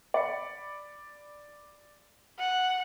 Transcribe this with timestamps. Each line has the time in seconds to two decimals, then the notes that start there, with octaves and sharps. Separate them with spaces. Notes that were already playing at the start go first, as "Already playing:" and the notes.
0.14 D5 B5 C#7
2.39 F#5